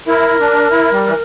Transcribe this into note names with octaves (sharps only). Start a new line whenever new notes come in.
E4 A#4
D4
E4
G3
E3